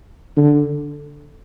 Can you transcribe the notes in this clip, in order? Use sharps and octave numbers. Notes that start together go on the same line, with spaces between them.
D3